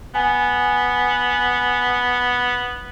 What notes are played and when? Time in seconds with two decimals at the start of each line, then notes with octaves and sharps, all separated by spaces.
0.15 B3 G#5